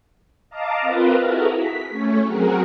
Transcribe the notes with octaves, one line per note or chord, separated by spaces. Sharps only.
D#5 F5 A5 A#5 D6
C4 F4 A#4 B4
E4 F#4 G#4 A4 A#5
B6
A3 C#4 C#5
F#3 C4 F#4 G#4 A#4